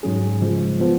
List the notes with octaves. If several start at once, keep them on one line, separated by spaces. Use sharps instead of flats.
G#2 F#3 C#4 G#4
C#3 F3 G#3
F3 B3